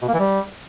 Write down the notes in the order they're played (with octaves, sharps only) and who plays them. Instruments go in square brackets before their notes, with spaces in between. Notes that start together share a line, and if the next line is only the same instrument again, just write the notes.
[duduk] B2
A#3
E3
G3